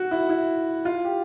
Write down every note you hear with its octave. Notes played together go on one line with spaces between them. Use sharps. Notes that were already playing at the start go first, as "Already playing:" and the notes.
Already playing: F#4
E4
E4
F4
G4